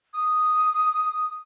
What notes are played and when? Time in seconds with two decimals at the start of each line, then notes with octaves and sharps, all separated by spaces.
0.14 D#6